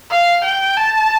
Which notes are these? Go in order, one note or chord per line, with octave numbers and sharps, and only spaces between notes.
F5
G5
A5